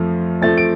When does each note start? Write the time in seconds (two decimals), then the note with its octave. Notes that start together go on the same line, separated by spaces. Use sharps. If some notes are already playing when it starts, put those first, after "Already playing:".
Already playing: F2 F3 A3
0.42 F2 F3 A3 A6
0.58 D7